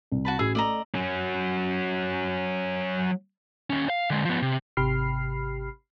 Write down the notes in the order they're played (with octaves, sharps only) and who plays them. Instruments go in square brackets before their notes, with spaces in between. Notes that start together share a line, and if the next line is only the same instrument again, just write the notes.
[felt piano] C2
[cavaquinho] F#4 A5 B5
[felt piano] A1 F#4 E6 [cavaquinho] G#4 G#5
[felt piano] A3 [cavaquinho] D5 D#5 A#5
[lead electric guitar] F#3 C#4
D#2 C#4
F5
D3 G#3
F3 B3
C3
[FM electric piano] G#1 C3 G4 B5 F6 C7